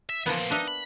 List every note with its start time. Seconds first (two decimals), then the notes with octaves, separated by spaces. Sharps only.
0.09 E5
0.26 D3 E3 F3 A#3 B3
0.39 A#2 C4
0.51 D4 D#4 E5
0.67 B5